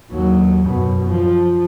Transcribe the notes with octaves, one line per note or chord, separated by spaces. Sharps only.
D#2 F#3
F#2 B2
F3